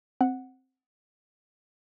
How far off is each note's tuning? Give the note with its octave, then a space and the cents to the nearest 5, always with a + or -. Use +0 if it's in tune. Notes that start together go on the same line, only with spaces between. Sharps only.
C4 +0 F#5 +0